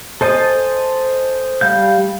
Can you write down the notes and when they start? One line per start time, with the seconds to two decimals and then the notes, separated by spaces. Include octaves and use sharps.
0.21 A4 C5 D#5 G#5 A5
1.61 G3 F5 G6